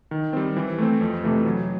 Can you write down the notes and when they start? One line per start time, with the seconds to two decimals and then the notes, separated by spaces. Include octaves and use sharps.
0.11 D#3
0.33 G3 C4
0.57 E3
0.78 A3 C4
1.01 F2
1.24 C3 E3 A3
1.46 F#3